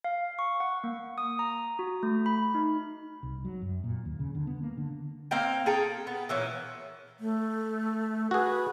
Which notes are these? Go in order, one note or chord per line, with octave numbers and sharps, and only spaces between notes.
F5
C#6
F#5
A#3
D#6
A#5
F#4
A3
B5
D#4
C2
F#3
F#2
A#2
D#2
C#3
D3
B3
A#3
D3
A#3 C4 F5 G5
G#4 A4 G5 A#5
B3
A#2 E3 C#4
A3
F#4 G#4 B4